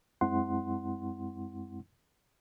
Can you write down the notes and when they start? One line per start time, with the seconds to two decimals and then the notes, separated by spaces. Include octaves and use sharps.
0.21 F#2 G#3 C4 E4 F#5 C6